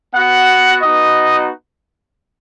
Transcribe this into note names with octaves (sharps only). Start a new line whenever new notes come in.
B3 F#4 F#5
B3 D#4 F#4 D#5